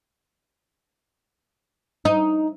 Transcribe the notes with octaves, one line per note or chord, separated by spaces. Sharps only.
D#4